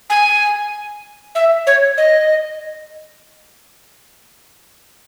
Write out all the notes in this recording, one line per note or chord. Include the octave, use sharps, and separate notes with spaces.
G#5
E5
C#5
D#5